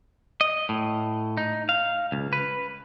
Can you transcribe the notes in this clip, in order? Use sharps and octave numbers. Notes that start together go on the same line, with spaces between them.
D#5
A2
D#4
F5
C#2
B4